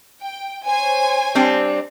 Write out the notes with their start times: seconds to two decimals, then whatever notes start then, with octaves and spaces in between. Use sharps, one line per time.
0.21 G5
0.67 C5 C#5 G#5
1.35 G3 C4 D4